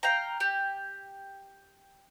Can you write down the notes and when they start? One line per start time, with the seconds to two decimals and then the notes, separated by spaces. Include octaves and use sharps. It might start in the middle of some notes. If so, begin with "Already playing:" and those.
0.03 F5 G5 A#5
0.40 G4